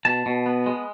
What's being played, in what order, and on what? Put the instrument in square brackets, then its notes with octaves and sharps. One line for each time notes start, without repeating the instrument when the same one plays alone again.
[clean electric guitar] B2 A5
B2
B3
G#3